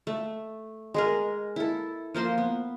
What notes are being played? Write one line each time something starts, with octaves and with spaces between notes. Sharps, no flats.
A3
G#3 G#4 A#4
E4 A4
F3 A#3 C5 C6
B3